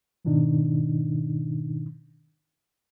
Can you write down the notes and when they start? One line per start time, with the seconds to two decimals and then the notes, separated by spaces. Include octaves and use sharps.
0.25 G#2 B2 D#3 D4 D#4